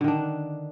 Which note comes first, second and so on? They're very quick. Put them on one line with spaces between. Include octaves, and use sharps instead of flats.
D3 D#3 D4